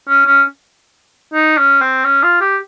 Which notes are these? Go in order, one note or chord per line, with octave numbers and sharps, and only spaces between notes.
C#4
C#4
D#4
C#4
C4
C#4
F4
G4